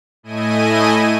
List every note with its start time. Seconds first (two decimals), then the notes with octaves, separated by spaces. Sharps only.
0.23 A2 A3 E4 D#5 G#5 D#7